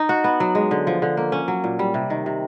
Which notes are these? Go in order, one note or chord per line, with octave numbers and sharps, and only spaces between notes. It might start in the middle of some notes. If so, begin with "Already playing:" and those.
Already playing: D#4
F#4
B3
F#3
G#3
D3
F3
D3
A#3
C#4
F#3
A#2
G3
C3
D#3
C3